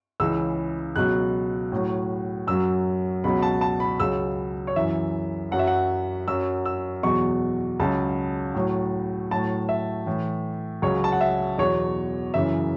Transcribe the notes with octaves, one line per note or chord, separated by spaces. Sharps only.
C#2 C#3 E3 E6
C#2 B2 F#3 F#6
A2 F#3
F#2 F#3 E6
C#2 B2 F#3 B5
A5
A5
B5
C#2 C#3 F#3 E6
C#5
F#2 E3 E5
F#2 F#3 F#5
E5
F#5
F#2 F#3 E6
E6
E2 B2 F#3 C#6
C#2 C#3 F#3 A5
A2 F#3
A2 F#3 A5
E5
A2 E3
C#2 C#3 F#3 C#5
A5
F#5
E5
E2 B2 F#3 C#5
F#2 C#3 E3 E5